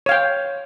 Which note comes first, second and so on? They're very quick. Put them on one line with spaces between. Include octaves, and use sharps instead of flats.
C#5 F5 G5